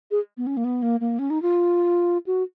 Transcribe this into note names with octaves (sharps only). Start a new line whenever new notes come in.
G#4
B3
C#4
A#3
B3
A#3
A#3
C#4
D#4
F4
F#4